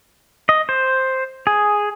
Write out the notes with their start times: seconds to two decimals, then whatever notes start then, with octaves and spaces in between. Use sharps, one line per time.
0.49 D#5
0.69 C5
1.47 G#4